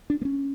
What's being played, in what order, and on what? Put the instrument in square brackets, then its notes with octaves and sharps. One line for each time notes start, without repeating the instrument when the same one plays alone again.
[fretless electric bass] D4
A#3
C#4